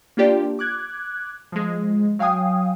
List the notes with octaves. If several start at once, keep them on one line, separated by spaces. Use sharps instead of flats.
A#3 D4 F4 G4 D5
D6 F#6 G#6
F3 G#3
F#3 F5 G5 G#5 D#6